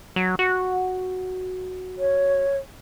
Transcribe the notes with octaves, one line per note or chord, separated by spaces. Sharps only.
F#3
F#4
C#5